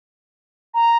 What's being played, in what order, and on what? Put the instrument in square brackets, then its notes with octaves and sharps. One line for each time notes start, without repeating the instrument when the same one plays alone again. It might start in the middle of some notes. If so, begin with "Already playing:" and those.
[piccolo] A#5